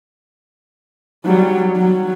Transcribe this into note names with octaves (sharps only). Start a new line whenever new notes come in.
F#3 G3
F#3